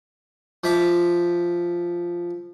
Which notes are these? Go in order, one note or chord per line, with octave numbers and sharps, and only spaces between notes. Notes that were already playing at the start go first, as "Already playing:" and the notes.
F3 E5 D6